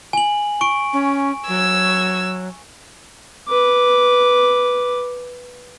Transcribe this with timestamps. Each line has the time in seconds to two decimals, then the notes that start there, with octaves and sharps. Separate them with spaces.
0.13 G#5 F#7
0.61 C#6 D7
0.93 C#4
1.48 F#3 E6 G#6
3.48 B4 D6